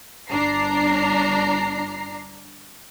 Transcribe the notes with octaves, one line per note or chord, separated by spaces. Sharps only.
G1 D4 A#5 C7